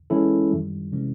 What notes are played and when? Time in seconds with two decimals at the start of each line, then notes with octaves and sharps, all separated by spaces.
0.10 E3 G#3 C#4 E4 A4
0.51 F#2 D#3 G3
0.92 C3 E3 G#3 C#4